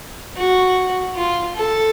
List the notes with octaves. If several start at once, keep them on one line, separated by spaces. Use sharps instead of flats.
F#4
F4
A4